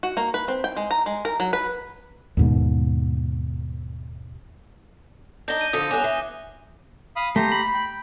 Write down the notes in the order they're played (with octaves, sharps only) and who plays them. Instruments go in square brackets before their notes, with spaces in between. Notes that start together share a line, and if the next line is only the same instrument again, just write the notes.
[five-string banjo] F#4
A#3
B4
C4
G5
G#3
A#5
G#3
A#4
F#3
B4
[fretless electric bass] D#2 G#2 B2
[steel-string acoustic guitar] D4 D#4 [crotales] G6 A#6 G7
[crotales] D#7
[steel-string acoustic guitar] D3 F3 A4 [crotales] D#6
[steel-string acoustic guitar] G2 B3 C#4 [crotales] D6 F#6
[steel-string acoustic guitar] E3
[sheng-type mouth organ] F5 B5 D#6
[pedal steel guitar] A3 [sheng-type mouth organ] G4 A#5 C6
[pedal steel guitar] B5
[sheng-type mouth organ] G5